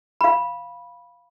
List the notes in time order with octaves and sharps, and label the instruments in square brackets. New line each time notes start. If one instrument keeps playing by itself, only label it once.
[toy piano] F5 B5